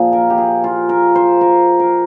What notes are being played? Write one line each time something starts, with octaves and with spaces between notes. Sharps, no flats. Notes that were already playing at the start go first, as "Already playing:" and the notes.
Already playing: A#2 F3 G#4
A#4
G4
G#4
F4
A#4
C5
A#4
A#4